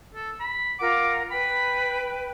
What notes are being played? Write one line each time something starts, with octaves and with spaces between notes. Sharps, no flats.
A4
B5
F4 A#4 F#5 D6
B4 G5 B5